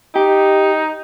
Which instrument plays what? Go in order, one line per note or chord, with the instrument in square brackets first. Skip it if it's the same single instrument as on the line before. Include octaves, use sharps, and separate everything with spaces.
[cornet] D#4 [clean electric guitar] G4